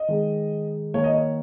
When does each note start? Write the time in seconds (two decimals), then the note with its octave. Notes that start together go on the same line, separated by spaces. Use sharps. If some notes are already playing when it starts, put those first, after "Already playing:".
Already playing: D#5
0.08 D#3 G#3
0.94 D#3 A#3 C#5
1.04 D#5
1.13 C#5